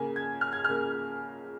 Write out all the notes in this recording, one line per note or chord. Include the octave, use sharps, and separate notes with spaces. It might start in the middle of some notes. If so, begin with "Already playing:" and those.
Already playing: C#3 A#3 G#5
G#6
F6
G#6
C#3 A#3 F6